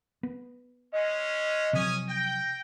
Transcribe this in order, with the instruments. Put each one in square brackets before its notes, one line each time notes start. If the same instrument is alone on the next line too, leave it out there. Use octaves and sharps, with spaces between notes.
[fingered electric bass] B3
[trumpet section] G#3 C#4 [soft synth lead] D#5
[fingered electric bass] C3 F3 F#3 [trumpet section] C#4 G#5 D#6
[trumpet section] G5 [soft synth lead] A#6